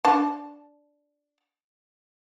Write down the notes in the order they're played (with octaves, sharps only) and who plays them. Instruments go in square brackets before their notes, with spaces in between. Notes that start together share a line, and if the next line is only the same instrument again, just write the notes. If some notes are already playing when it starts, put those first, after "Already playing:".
[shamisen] D4 A5